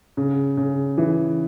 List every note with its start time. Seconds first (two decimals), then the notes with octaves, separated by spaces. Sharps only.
0.17 C#3
0.57 C#3
0.98 E3